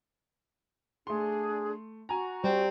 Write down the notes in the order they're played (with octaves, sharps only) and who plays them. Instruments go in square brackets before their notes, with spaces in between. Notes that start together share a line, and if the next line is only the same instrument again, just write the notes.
[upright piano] A3 C6 [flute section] D4 G#4
[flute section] F#4 [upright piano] G#5 A#5
[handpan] G3 [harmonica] C4